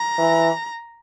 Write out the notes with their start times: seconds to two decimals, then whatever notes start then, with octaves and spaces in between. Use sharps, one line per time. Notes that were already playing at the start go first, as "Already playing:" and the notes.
Already playing: A#5
0.19 E3